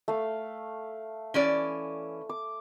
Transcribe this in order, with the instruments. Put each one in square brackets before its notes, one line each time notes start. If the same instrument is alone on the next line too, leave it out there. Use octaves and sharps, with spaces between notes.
[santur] A3 F5
[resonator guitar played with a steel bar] E3 C#4 D5
[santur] D6